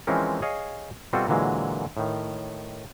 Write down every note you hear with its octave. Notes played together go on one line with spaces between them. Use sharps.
E3 F3 G#3 C4 C#4 A#4
G#4 C#5 D#5 F5
B2 G3 C4 F4 F#4 A4
A#2 D3 E3 F#3 G#3
A2 D#3